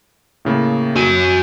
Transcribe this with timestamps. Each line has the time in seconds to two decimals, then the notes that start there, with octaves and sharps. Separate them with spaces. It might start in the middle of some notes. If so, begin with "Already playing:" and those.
0.45 A2 C#3 A#3
0.96 F#4 G#5